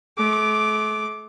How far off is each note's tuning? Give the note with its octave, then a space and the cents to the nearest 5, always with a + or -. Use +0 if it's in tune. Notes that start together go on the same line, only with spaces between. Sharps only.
A3 -40 D6 +0